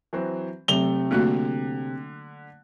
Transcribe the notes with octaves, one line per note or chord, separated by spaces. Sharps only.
E3 F#3 C4
C3 F#3 A3 F7 G7
D3 A3 A#3 F#4 F#6